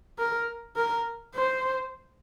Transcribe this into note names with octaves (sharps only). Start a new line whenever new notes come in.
A#4
A#4
C5